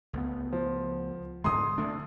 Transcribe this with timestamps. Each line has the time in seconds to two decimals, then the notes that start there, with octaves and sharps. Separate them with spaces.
0.13 C#2 A3 B3
0.52 F3
1.44 G#2 D3 G#3 C6 D#6
1.78 D3 A3 D4